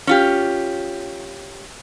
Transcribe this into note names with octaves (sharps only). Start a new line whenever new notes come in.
C#4 F4 G4